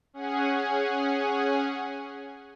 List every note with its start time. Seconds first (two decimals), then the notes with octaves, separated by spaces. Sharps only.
0.14 C#4 G#4 F#5 G#5